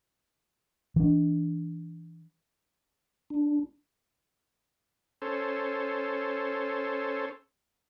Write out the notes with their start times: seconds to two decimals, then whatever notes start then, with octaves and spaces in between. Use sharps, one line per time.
0.96 E3 D4
3.30 D4
5.22 C#4 A4 C5